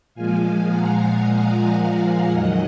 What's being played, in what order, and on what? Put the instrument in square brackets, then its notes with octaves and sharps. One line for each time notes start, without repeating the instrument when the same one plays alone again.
[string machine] A#2 F3 G#3 F5 G#5
F#5 A#5
F5 G#5
F2 D#3 F#3 D#5 F#5